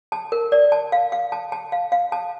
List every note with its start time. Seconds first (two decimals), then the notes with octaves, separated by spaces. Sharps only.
0.12 A5
0.32 A#4
0.52 D5
0.72 A5
0.92 F5
1.12 F5
1.32 A5
1.52 A5
1.72 F5
1.92 F5
2.12 A5